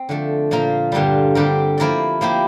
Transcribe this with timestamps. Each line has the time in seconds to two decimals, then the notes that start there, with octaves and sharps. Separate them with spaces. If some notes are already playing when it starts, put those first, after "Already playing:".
Already playing: C4
0.09 D3 F3 A3
0.51 A#2 F3 A#3 F4 A#4
0.92 G2 D3 G3 A#3 F4
1.35 D3 G3 C4 G4 A#4
1.78 F3 A#3 E4 A#4 D5
2.21 F3 A#3 E4 G4